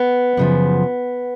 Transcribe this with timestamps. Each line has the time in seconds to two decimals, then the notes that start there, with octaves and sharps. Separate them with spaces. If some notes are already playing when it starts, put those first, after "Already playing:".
Already playing: B3
0.37 F#2 C#3 F3